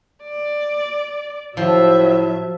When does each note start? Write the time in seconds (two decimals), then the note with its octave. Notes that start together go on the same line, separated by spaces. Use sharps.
0.24 D5
1.57 A2 F3 F#3 E5